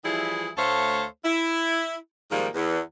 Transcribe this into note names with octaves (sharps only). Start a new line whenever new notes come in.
E3 F3 G3 E4 G#4
D2 A3 A4 C5 C#5 F5
E4
G#2 D#3 F3 G3 A#3
E2